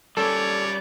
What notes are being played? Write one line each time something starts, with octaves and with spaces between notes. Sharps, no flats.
G3 C#4 A4 C#5 D5